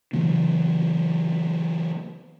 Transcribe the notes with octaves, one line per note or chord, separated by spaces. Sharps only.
C#3 E3 F#3 A#3